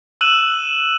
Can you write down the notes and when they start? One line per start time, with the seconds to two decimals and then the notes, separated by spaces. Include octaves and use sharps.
0.21 E6 F#6 D#7 E7 F#7